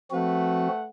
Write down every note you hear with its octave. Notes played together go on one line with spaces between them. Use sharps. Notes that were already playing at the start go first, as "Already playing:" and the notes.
F3 A3 C4 F#4 B4 F#5